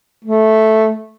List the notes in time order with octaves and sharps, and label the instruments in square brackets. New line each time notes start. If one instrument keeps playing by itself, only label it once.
[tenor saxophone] A3